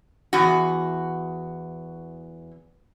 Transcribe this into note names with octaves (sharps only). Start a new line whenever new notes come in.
E2 F#4